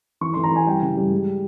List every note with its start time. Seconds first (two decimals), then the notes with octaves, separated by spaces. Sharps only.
0.21 E3 C#6
0.33 E3 C6
0.44 A#5
0.51 E3 G#5
0.67 G3 G5
0.82 C#3
0.97 G3
1.11 G#3